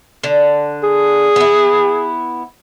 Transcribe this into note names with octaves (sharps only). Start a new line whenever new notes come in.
D3
G#4
B3 E4